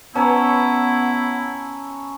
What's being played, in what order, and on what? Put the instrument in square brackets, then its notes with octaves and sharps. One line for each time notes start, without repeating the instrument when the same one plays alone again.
[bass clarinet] B3 [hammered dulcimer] C#4 B4 C#5 [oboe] E4 [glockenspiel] A5 A#5 E6